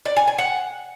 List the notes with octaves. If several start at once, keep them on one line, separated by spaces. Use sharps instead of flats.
D5
G#5
G#5
F#5